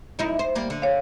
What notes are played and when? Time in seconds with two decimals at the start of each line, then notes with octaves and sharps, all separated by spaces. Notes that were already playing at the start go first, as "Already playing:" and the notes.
0.19 F#2 D#4 E4
0.39 C5
0.55 G3 A#3
0.70 D3
0.82 C#5 F5